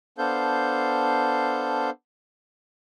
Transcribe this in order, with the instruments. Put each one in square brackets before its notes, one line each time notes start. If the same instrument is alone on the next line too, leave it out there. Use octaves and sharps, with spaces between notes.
[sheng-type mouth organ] B3 D4 A4 C5 F5 G6